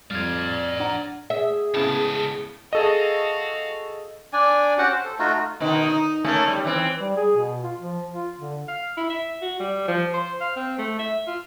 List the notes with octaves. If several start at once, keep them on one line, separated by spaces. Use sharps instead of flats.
F2 G3 D5 F5 F6 G#6
D4 F#5 A#5
G#4 E5
C#2 A2 C#3 B3 A5
F#4 G#4 A4 D#5 F5
D4 D5 G#5
C#4 F#4 G4 F#5
C5
A4
A3 D#4 F4 F#4
B2 D#3 D#4
D#4
A3 A#3 C#4
G3
E3 C4
G3
G#4
B2
F4
F3
F4
D3
F5
E4
E5
F#4
G3
F3
C5
F5
C4
A3
E5
F4